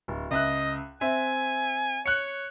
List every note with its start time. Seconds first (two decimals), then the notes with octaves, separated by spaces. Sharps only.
0.08 D1
0.31 C#2 D#5 E5 F#6
1.01 C4 E5 G#5
2.06 C#5 F#6 C#7